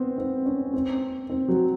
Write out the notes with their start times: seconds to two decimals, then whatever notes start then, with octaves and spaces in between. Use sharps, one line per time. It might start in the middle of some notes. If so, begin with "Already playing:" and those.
Already playing: B3 C4
0.18 C4
0.46 C#4
0.74 C4
1.29 C4
1.48 F#3